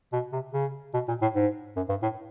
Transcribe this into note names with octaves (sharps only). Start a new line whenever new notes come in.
B2
C3
C#3
B2
A#2
A2
G#2
F#2
G2
A2